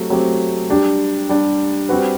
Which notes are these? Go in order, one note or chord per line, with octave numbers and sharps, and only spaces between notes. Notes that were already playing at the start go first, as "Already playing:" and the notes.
Already playing: F#3 A3 C4 G4
F#3 A3 C4 G4
G3 D4 G4
G3 D4 G4
G3 C4 F#4 B4